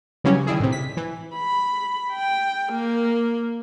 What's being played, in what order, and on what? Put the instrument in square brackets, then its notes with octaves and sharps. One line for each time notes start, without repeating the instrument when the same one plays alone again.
[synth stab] C#3 E3 F#3 G3 C#4
D#3 G3 E4 G#4
A2 C3
B6
E3
[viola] B5
G5
A#3